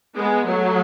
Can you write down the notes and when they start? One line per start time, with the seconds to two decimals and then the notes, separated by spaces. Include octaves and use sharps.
0.17 G#3 B3
0.48 F#3 A3